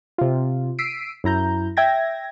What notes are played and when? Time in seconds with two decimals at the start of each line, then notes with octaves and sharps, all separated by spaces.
0.18 C3 F4
0.78 E6 B6 C7 D7 D#7
1.24 F#2 E4 A#5 G6
1.77 E5 G5 G#6 A#6